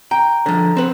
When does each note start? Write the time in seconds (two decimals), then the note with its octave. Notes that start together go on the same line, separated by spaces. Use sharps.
0.11 G5 A#5
0.46 D3 F3
0.77 C4 B4